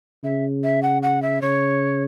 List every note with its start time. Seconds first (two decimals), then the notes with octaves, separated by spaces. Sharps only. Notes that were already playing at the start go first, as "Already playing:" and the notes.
0.24 C#3 E5
0.63 E5
0.83 F#5
1.02 F#5
1.22 E5
1.41 C#3 C#5